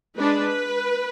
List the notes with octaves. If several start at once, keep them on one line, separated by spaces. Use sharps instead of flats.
G#3 D4 B4